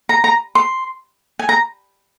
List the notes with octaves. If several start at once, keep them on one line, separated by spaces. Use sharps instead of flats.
A#5
A#5
C6
G#5
A#5